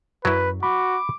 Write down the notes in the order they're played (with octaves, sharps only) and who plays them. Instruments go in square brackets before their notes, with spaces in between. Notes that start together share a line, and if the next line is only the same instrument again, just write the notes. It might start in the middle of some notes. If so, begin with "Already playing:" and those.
[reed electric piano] F#2 [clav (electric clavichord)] F#3 E4 [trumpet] B4
[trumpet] F#4 [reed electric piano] B5 [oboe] D6